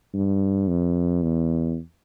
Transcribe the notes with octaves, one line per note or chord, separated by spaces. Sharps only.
G2
F2
E2